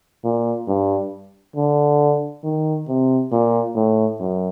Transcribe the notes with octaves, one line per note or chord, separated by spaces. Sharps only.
A#2
G2
D3
D#3
C3
A#2
A2
F#2